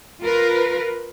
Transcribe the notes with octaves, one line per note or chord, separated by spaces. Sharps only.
F4 A#4 B4